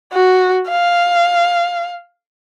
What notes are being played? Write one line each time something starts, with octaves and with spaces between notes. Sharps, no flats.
F#4
F5